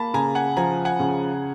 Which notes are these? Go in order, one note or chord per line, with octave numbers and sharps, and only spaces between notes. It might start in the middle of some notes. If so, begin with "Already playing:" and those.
Already playing: A#3 A5 B5
C#3 G#5 A#5
F#5 G#5
F3 G#5 A#5
F#5 G#5
C#3